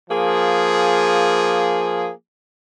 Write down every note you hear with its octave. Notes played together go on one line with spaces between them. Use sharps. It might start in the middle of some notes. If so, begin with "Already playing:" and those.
F3 A#3 G#4